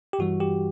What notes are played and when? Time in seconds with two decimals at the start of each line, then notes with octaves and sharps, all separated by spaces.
0.13 G4
0.19 G2 E3 G3 F#4
0.40 G4